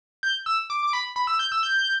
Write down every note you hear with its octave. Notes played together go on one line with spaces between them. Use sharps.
G6
E6
D6
D6
B5
B5
E6
G6
E6
G6